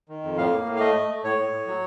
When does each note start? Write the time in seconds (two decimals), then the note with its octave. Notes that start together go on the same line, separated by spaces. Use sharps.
0.09 D#3
0.23 F2
0.38 A2 F5
0.52 A#3
0.66 A2
0.76 F5
0.80 A3 D#5
0.95 A3
1.09 A3
1.24 A2 C#5
1.39 A2
1.52 A2
1.67 F#3